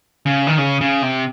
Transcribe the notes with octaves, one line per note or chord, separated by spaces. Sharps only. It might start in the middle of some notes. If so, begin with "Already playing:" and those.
C#3
D#3
C#3
C#3
C3